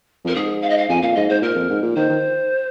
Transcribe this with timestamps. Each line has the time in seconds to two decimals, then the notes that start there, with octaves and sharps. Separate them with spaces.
0.25 F2 A#4
0.35 G#2 G#4
0.62 F5
0.70 D#5
0.78 F5
0.89 F2 G#5
1.02 A#2 F5
1.15 G#2 D#5
1.29 G#2 C5
1.42 A#2 A#4
1.55 F2
1.70 G#2
1.83 A#2
1.96 D#3 C5
2.09 D#3